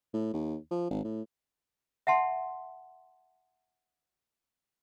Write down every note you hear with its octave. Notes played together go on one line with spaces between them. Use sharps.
A2
D#2
F3
G#1
A2
E5 F#5 A5 C6